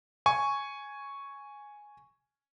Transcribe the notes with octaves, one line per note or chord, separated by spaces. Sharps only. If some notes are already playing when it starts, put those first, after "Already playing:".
G#5 C#6